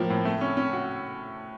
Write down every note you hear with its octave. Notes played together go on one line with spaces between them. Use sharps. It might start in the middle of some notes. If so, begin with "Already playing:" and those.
Already playing: A2 F3 A#3
A2
A3
C#4
C#4
F#4